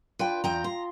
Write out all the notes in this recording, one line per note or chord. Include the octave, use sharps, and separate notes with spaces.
D4 F4 B4 D5 G5
E2 G5 A#5 D#6
A#5 C6